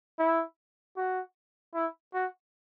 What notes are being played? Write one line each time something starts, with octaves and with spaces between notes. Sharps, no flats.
E4
F#4
E4
F#4